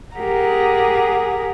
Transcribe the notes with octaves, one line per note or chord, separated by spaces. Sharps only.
G4 G#4 A#4 F#5 A#5